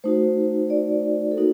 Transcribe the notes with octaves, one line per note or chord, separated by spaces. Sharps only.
A3 D#4 F#4 C5
D5
A4
A#3 D#4 F#4 A#4